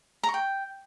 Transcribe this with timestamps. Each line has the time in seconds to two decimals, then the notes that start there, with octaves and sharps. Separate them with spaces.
0.23 A#5
0.29 C#6
0.34 G5